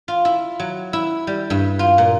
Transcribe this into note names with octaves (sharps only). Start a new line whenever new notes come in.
F4
E4
F#3
E4
G3
G2
F4
A#2